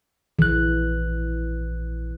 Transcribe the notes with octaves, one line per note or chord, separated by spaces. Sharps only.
A#1 E3 F#6